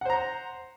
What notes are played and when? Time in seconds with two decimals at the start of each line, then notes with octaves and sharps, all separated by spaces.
0.01 F#5
0.05 C5
0.10 A#5